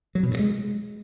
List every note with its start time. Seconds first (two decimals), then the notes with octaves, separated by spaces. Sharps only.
0.15 F#3
0.23 B2
0.31 G2
0.39 G#3